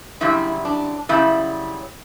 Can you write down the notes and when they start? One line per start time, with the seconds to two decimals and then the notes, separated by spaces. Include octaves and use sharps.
0.21 F#2 C#3 G3 E4
0.65 D4
1.09 F#2 C#3 G3 E4